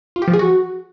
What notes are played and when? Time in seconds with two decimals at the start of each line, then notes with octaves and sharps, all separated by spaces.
0.16 F4
0.22 G4
0.28 F3
0.33 G#4
0.39 F#4